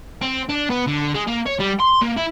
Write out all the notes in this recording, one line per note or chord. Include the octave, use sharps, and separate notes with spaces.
C4
D4
B3
D3
G#3
A#3
C#5
G3
C6
A#3
E4